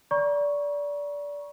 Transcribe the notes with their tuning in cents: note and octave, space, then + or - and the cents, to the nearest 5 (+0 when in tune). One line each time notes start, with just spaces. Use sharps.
D5 -20 A#5 +35 C#6 +0